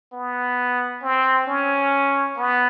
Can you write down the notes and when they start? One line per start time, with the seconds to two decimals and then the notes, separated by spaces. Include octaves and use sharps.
0.13 B3
1.03 C4
1.47 C#4
2.37 B3